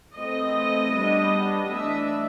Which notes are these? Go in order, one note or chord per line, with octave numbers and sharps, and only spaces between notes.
E3 A3 C4 D#5
G3 B3 D4
E3 A3 D4 E5